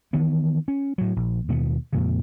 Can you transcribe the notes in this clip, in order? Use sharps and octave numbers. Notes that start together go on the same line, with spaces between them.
D#3 E3 B3
C#4
A2 F#3
A#1
D#2 B2 G#3 B3
F2 A#2 C#3